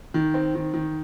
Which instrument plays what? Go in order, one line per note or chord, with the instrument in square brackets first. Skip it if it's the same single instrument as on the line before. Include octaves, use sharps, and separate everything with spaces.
[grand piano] D#3
C4
D#3
D#3